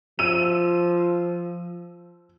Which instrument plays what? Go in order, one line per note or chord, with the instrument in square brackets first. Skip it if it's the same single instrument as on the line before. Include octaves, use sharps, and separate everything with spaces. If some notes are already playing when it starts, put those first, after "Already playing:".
[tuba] F3 [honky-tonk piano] E6 D#7